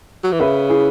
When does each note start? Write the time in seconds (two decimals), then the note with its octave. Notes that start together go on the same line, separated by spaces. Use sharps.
0.24 F#3
0.32 E3
0.40 C#3 B4 E5
0.69 E4 G#4